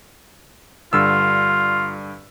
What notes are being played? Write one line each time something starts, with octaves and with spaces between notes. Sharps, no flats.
G2 D3 F4 E6